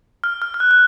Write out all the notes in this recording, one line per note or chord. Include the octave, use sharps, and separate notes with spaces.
F6
F6
F6
F#6
F#6